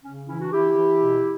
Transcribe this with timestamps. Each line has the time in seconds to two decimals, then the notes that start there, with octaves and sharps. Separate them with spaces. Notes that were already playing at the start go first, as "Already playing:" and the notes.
0.04 C#3 C#4
0.28 E3 C#4 E4
0.40 D4 F#4
0.52 E3 E4 G4
0.76 E3
1.00 B2